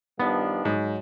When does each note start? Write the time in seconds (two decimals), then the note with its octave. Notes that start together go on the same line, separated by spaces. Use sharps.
0.20 G2 D#3 F3 B3 D4
0.65 G#2 F#3